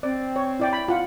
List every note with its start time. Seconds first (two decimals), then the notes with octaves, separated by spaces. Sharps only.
0.03 C4 D5
0.36 C#5
0.60 E4 D5 G5
0.73 B5
0.88 F4 F#5